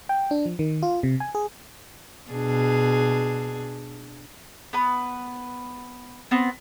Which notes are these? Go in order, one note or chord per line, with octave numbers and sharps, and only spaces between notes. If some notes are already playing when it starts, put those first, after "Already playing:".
G5
D4
F3
D#3
F4
C3
G#5
G#4
B2 D4 G#4
B3 B4
B3 C4